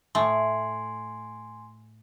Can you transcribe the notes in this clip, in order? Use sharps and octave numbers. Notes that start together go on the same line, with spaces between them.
A2 A3 G#5 C6